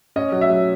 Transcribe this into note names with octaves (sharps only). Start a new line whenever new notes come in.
C#4 D#5
F#3
E5
F#3